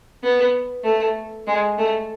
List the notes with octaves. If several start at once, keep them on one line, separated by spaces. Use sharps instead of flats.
B3
A3
G#3
A3